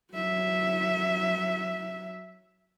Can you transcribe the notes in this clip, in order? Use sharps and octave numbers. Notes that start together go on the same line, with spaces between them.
F#3 E5